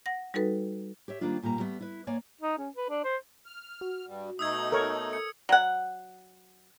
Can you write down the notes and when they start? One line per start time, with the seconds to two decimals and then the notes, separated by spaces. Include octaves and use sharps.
0.06 F#5 A#6
0.34 G3 D#4 F#4 A4 B4
1.08 G4 C#5 E5
1.21 D#3 G3 A#3 C4 D4 F4
1.42 D#2 A#2 G3 A#3 A#5
1.60 G3 A3 B3
1.80 E4 B4
2.07 A#3 C#5 D5 G#5
2.41 D#4
2.58 C#4
2.76 B4
2.90 D4
3.04 C5
3.46 F6
3.81 F#4
4.07 G2 G3
4.39 B2 A3 D#4 D#6 E6 G#6
4.72 A4 A#4 C#5
5.13 C#7
5.49 F#3 F#5